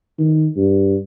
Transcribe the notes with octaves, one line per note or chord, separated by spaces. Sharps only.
D#3
G2